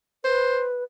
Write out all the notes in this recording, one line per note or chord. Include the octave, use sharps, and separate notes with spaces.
B4 C5